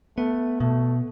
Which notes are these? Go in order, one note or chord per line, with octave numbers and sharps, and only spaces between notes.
A3 B3
B2 A3